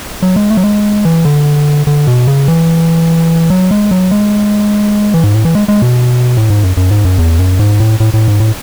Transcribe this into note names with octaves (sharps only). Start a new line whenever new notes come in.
F#3
G#3
A3
F#3
G#3
E3
D3
D3
B2
C#3
E3
F#3
G#3
F#3
G#3
E3
G#2
A2
E3
G#3
G#3
B2
A2
G#2
F#2
F#2
G#2
F#2
E2
F#2
G#2
A2
A2
A2
G#2
A2